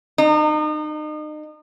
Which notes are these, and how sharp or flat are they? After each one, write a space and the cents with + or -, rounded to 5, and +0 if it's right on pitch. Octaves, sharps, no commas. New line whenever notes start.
D#4 -35